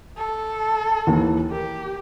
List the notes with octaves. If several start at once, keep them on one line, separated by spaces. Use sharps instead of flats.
A4
D#2 E3
G4 A#4